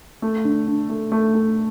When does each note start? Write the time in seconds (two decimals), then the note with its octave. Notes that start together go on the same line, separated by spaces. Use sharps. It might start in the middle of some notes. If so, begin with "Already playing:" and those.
0.22 A3
0.44 D3
0.67 D3
0.89 A3
1.12 A3
1.34 A3